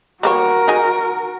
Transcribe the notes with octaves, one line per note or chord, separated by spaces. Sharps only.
G3 A#3 F#4 A#4 C#5
D#4 G#4